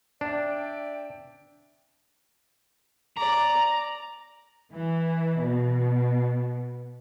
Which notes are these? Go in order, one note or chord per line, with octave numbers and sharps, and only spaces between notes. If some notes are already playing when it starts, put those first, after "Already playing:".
D4 D5 E5 G5
D5 A#5
E3
B2